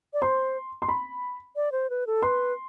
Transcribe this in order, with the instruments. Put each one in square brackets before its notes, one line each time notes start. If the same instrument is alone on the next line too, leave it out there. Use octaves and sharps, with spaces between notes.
[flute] D5
[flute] C5 [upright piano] C6
[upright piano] C6
B5
[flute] D5
C5
B4
A4
[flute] B4 [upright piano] C6